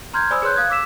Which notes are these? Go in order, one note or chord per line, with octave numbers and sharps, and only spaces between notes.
A#5 C6 F6 G6 G#6
C5 D5 G#5 B5 D#6 E6
G#4 B4 C#5 C6 F#6 G6
F5 D#6 F#6 G#6
D6 E6 B6 E7